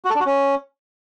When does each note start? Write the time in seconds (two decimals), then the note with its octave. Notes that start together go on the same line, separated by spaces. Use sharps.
0.05 F#4
0.10 A4
0.15 D4
0.20 F#4
0.26 C#4